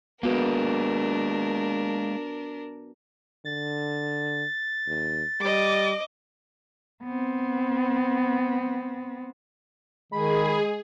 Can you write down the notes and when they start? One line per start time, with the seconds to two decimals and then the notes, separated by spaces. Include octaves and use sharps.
0.23 G#3 A#3 B3 D4 F#4 A#4 B4
3.45 D3 A6
4.87 D#2
5.41 G3 D#5 D6
7.03 B3 C4
10.12 D#3 G#3 G#4 B5